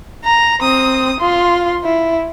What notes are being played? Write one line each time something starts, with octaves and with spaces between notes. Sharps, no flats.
A#5
C4 D#6
F4 C6
E4